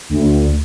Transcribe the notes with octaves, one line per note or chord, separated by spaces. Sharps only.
D2